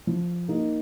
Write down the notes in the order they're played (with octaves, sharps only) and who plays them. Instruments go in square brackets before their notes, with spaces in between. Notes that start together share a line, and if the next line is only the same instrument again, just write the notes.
[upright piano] F3
A#3 D#4